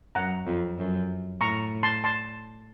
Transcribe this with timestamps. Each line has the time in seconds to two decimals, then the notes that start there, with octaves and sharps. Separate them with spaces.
0.15 F#2 F#5 A#5
0.46 F2
0.78 F#2
1.41 A2 A#5 C#6
1.83 A5 C6
2.04 A5 C6